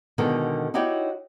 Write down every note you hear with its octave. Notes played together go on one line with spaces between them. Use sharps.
B2 D3 D#3 G#3 F#4 A4
D#4 E4 F#4 G4 C#5 D5